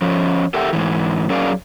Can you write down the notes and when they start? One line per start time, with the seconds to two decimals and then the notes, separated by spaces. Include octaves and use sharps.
0.02 F3 C#4
0.54 G4 A4 A#4 E5 F#5 G5
0.73 G#2 E3
1.30 F#3 C#4 G#4 A#4 D5 F5